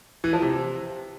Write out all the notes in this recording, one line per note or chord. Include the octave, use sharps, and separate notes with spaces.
E3
F3
C3